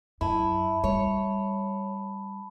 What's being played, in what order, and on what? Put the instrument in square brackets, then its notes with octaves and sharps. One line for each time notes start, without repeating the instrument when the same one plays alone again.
[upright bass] F#2 [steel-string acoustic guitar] E4 [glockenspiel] A5 B5
[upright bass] G3 [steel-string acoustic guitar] C#5